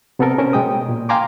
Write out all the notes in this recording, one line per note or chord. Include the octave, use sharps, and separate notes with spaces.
C3 B3 C4 A4 A#4
C#4 A#4 C5
B2 G#3 G5 D#6
A#2
F5 G5 G#5 A#5 C6 D6